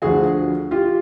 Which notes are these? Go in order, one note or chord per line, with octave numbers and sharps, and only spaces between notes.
D2 D3 F3 F#4 G#4
F4 G4